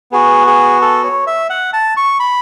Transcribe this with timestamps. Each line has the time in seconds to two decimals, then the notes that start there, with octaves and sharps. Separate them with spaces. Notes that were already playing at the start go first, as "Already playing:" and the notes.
0.12 B3 F#4 G#4
0.47 G#4
0.81 A4
1.04 C#5
1.27 E5
1.50 F#5
1.73 A5
1.97 C#6
2.20 B5